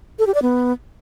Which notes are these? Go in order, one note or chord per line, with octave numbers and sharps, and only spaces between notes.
A4
G4
D5
B3